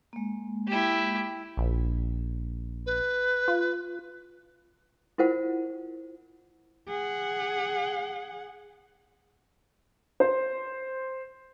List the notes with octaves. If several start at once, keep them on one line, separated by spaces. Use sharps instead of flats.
G#3 A#3
E4 G4
A#1
B4
F4
E4 F4 A#4 C5 F#5
G#4 F#5
C5